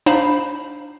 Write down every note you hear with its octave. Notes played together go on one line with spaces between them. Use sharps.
D4 D#4 C5 F5 B5